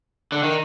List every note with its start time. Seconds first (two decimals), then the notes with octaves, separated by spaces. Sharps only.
0.32 D3
0.43 D#3